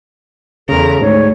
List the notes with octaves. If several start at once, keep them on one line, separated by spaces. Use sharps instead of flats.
E2 C#3 A4 A#4
D2 G#2 C#5